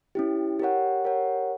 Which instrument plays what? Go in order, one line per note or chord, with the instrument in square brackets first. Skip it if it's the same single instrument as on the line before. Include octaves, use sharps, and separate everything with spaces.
[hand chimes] C#4 E4 G4
G4 A#4 C#5 F#5
G4 A#4 C#5 F#5